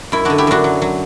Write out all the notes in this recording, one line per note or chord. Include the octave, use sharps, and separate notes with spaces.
F#2 E4
D3 D4 F#4
E4 G4
F#2 D4 F#4
F#3
F#3